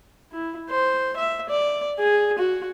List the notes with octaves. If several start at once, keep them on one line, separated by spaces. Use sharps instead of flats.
E4
C5
E5
D5
G#4
F#4